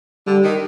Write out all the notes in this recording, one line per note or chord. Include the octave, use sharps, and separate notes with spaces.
D3 G3
D#3